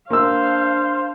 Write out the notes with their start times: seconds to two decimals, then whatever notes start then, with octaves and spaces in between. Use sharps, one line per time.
0.10 A#3 D4 C5 F5 E6